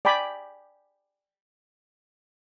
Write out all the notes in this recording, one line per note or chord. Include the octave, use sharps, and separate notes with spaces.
D5 G5 G#5 B5 D6